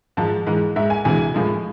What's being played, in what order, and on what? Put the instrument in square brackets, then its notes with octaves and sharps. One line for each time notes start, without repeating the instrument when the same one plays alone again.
[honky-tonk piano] G#2 F3 G#3 A5
G#2 E3 G#3
G#2 G#3 E5
G#5
D2 C3 E3 G#3 G#5
A2 F3 G#3